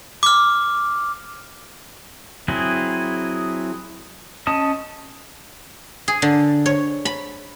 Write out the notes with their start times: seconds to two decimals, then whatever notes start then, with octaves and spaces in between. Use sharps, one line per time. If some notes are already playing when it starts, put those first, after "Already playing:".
0.23 D6 F6
2.48 F#3 C4 E4 G#4
4.47 C#4 D#5 A5 D#6
6.08 G#4
6.22 D3
6.66 C#5
7.05 B5